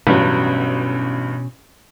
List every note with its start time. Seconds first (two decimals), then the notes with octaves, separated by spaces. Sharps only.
0.07 A1 G2 B2 F#3 C#4